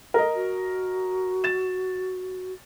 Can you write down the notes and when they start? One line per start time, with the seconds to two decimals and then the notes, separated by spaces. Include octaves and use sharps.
0.14 A4 A#4 D#5
0.35 F#4
1.44 A6 E7